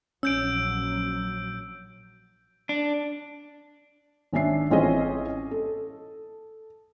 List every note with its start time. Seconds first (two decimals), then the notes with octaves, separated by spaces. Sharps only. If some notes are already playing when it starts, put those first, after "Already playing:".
0.23 A#1 F#3 C#4 E6 G6 D7
2.69 D4
4.33 G#1 C#4 D4 E5 C7
4.71 A1 C4 C#4 F4 G#4 D#5
5.51 A4